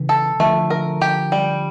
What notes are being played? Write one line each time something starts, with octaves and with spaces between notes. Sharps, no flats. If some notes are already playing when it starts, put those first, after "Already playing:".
Already playing: C#3 E3
A4
D3 F3 A3
A#4
G4
G3